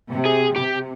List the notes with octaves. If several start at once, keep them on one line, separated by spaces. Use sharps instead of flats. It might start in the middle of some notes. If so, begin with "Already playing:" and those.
C3
G#4
C3 G4